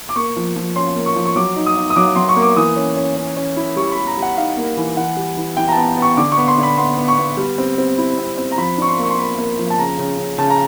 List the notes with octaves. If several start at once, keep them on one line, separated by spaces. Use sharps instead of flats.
D6
A#3 C#6
F3
F3
C#4 C6
A#3
C#6
F3
C#6
F#3 D6
D#4
D#6
D#4
D#6
F#3 D6
F#3 C6
C#6
A#3
D6
E3 D#6
C#4
C#4
C#4
C#4
E4
G3 C#6
G3 B5
A#5
G3
F#5
D#4 F5
A#3
E3
E3 F#5
G3
E3
E3 G5
A#5
B3 A5
B3
C#6
D3 D6
C#6
B3
C6
D3
B5
B3 C6
B3
C#6
B3
G3
C4
C4
E4
C4
C4
A#5
F3 B5
D4 C#6
C6
A#3
C#6
C6
A#3 B5
A#3
F3
A5
C#3 A#5
C#3
C#3
C#3 A5
A#5